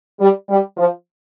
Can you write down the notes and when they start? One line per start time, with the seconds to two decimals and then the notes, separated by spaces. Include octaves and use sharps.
0.20 G3
0.49 G3
0.77 F3